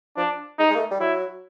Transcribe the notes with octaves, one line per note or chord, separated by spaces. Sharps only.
F3 D4
G#3 D#4
G#3
A#3
A3
G3
F#3 E4